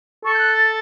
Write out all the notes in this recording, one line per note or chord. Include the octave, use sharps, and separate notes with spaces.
A4 C#6
G6
F#6
A6